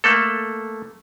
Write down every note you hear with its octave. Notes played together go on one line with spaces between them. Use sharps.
A3 A#3 A4